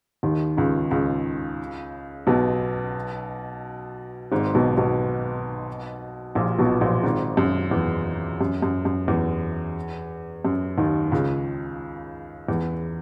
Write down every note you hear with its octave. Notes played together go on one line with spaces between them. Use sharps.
D#2 D#3
C#2 C#3
C#2 C#3
B1 B2
G#1 G#2
B1 B2
B1 B2
A#1 A#2
B1 B2
A#1 A#2
G#1 G#2
F#2
E2
F#2
F#2
F#2
E2
F#2
D#2 D#3
C#2 C#3
E2